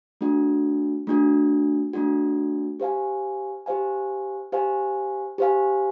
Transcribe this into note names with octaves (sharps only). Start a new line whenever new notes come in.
A3 D4 F#4
A3 D4 F#4
A3 D4 F#4
G4 C5 F5 G#5
G4 C5 F5 G#5
G4 C5 F5 G#5
G4 C5 F5 G#5